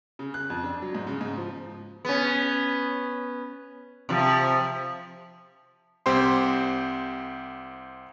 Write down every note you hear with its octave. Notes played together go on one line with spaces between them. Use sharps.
C#3
F#6
F2
D4
F#3
G#2
C#3
G#2
F3
B3 C#4
C3 F3
C2 C4 G4 C5 C6